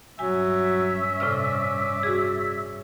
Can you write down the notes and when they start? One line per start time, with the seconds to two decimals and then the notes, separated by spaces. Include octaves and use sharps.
0.19 G2 F#3 C#4 E5 G#5
1.20 A2 C3 D5 F6
2.03 F#4 G#4